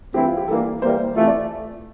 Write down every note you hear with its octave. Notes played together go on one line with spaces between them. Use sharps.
G2 E3 A3 C4 E4 G4
F4
G4
G2 E3 A#3 D4 A4
E3 G3 A#3 C5
C3 E3 A3 F4
D5